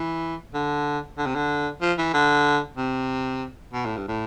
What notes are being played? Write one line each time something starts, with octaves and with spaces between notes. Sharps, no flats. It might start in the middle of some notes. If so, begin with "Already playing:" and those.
Already playing: E3
D3
D3
C3
D3
F3
E3
D3
C3
B2
A2
G2
A2